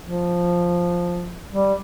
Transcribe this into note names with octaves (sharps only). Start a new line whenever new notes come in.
F3
G3